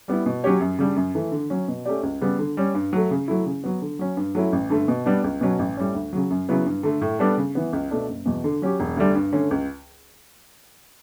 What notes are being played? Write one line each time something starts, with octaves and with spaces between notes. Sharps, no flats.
G3 B3 E4
B2
F#3 C#4 G4 C#5
F#2
C#3 G3 D4
F#2
E3 A3
D3
F#3 C#4
B2
A3 C#4 G4 D5
C#2
C#3 G3 B3
D3
G3 C#4
G2
F#3 A3
C#3
F#3 A3 E4
C#3
F#3 B3
D3
F#3 C#4
G2
F#3 A3 C#4 E4
A1
G2 D3 A3
B2
G3 B3 D4
C#2
B2 F#3 C#4
A1
A2 G3 C#4
D2
C#3 F#3
F#2
C#3 F#3 B3 E4
G2
D3 A3
A2
G3 B3 D4 A4
C#3
E3 B3
C#2
B2 A3 D4
F#1
E2 B2
D3
F#3 C#4 G4
E1
D2 D3 G3 D4
G2
D3 A3 C#4
C#2